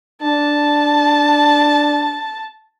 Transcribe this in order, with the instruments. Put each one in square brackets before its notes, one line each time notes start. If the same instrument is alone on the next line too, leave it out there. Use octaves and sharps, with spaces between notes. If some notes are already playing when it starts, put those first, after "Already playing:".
[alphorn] D4 [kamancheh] A5